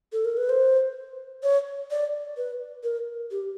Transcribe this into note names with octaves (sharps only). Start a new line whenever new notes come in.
A4
A#4
B4
C5
C#5
D5
B4
A#4
G4